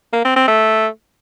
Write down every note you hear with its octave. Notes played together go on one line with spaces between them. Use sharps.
A#3
C4
C4
A3